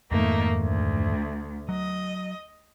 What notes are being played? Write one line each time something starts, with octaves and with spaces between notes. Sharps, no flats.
F2 G#2 D#3 A3 A#3 D#4
D2
F#3 D#5